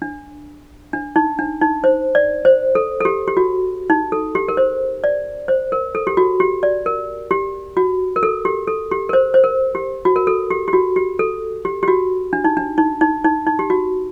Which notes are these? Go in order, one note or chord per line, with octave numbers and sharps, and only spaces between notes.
D4
D4
D#4
D4
D#4
C5
D5
C5
A4
A4
G4
G4
F#4
D#4
A4
G4
A#4
C5
D5
C5
A#4
A4
G4
F#4
G4
D5
A#4
G4
F#4
A#4
A4
G4
A4
G4
A#4
C5
C5
A#4
G4
F#4
A#4
A4
G4
G4
F#4
G4
A4
G4
G4
F#4
D4
D#4
D4
D#4
D#4
D#4
D#4
G4
F#4